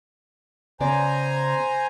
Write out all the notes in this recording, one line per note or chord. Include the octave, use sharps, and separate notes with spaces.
C#3 B3 C5 D5 G#5 A#5